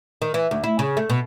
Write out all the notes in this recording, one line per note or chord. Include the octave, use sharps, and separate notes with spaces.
D#3
E3
D2
E4
C#3
A3
B2